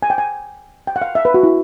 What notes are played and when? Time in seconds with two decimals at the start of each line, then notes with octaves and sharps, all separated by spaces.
0.02 G#5
0.10 G5
0.18 G#5
0.87 G5
0.96 F#5
1.02 F5
1.15 E5
1.25 B4
1.34 F#4
1.43 E4